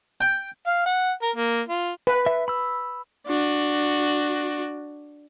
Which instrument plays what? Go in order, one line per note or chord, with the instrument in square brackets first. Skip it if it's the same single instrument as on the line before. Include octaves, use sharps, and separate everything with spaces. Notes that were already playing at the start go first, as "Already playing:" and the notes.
[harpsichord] G5
[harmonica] F5
F#5
A#4
A#3
F4
[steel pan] B4
[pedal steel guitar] E5
B5 E6
[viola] D4 F#4